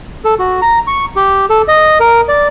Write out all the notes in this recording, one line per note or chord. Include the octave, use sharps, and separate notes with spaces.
A4
F#4
A#5
C#6
G4
A4
D#5
A#4
D5